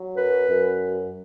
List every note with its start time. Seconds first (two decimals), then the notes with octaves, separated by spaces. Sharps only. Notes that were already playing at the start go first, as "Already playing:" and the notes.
Already playing: F#3
0.16 F#2 B4
0.49 F#2